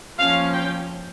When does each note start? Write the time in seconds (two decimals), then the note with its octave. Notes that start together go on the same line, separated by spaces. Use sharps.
0.19 F3 A#3 C#4 F5
0.53 G5